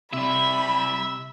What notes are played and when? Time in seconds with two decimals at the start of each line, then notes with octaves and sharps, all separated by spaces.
0.13 C3 G3 E4 E5 B5